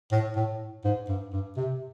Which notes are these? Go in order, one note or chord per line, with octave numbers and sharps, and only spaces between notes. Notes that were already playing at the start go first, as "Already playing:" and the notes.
A2
A2
G#2
G2
G2
C3